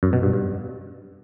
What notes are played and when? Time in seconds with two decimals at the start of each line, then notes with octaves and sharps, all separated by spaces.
0.03 F#2
0.13 B2
0.23 G2
0.33 G2